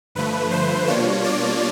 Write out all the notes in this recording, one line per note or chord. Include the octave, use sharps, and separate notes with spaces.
G2 D3 F3 A3 B4
C5
B2 G3 A#3 D4 F4 C#5
D5